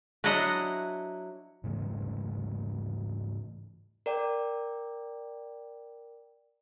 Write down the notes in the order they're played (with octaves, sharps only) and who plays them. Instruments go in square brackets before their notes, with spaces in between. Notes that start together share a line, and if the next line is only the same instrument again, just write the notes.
[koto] F#3 D4 E4 D#5 F#5
[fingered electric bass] G#2 C#3 E3 A3
[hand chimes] A#4 D5 G5